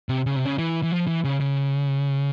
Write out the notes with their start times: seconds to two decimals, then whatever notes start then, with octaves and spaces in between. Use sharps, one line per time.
0.09 C3
0.26 C#3
0.36 C3
0.45 C#3
0.58 E3
0.83 E3
0.92 F3
1.07 E3
1.24 C#3
1.40 C#3